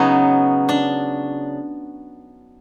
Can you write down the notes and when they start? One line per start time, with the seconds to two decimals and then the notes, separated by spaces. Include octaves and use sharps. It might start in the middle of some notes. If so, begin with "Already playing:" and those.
Already playing: C#3 F#3 B3 D#4
0.69 D4